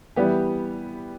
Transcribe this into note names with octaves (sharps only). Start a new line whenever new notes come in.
E3 G3 B3 G4